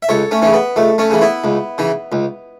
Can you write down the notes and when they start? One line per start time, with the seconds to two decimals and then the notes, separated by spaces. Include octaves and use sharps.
0.03 E5
0.09 C#2 A4 C#5
0.31 A3 C#4
0.42 C#3 E3 C#4
0.54 B3
0.76 C#2 A3
0.98 A3 C#4
1.10 C#3 E3
1.21 B3 E4
1.44 C#2
1.78 C#3 E3
2.12 C#2